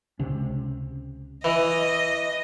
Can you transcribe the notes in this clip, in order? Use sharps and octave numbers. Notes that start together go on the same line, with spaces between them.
C#2 C3 C#4
E3 D#5